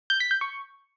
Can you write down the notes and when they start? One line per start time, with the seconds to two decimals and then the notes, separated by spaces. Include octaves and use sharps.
0.10 G6
0.20 B6
0.31 G6
0.41 C#6